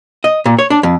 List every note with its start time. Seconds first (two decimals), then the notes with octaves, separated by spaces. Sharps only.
0.24 D#5
0.46 A#2
0.59 C#5
0.70 D4
0.83 F2